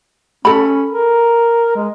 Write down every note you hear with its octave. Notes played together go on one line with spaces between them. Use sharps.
C#4 A4 B5
A#4
G#3